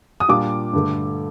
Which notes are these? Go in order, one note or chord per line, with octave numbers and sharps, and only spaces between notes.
D#6
A#2 G3 D4 F4 D6
G2 D3 A3